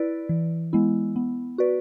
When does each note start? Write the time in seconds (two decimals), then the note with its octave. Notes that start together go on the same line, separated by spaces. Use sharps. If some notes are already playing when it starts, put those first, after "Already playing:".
Already playing: E4 B4 D5
0.29 E3
0.73 G#3 B3 E4
1.16 B3
1.58 F#4 B4 D5